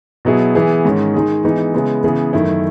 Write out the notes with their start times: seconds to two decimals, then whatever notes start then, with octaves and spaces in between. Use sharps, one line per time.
0.25 B2 F#3 B3 E4 G#4
0.55 E3 B3 E4 G#4
0.85 G#2 D#3 G#3 C#4
1.14 D#3 G#3 D#4 G#4
1.44 E3 G#3 B3 D#4 G#4
1.74 C#3 G#3 B3 E4 G#4
2.04 C#3 E3 B3 E4 G#4
2.33 F#2 D#3 A3 E4